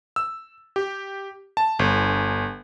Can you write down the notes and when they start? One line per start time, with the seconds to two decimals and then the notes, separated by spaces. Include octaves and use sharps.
0.16 E6
0.76 G4
1.57 A5
1.79 G1